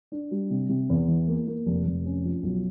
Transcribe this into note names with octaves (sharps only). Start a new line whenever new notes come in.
D4
G3
C3
C3
E2
E3
A#3
A#3
F1
F1
C#4
F3
B1